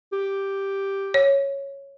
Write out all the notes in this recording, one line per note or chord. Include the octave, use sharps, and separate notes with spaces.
G4
C#5